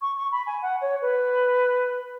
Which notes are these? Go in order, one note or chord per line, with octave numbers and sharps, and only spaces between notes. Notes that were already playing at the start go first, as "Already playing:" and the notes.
C#6
C#6
B5
G#5
F#5
C#5
B4